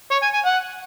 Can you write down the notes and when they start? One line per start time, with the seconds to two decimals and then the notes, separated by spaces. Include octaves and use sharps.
0.11 C#5
0.22 G#5
0.34 G#5
0.45 F#5